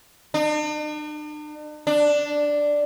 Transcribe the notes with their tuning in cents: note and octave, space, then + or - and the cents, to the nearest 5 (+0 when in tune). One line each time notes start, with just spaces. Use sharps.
D4 +45
D4 +0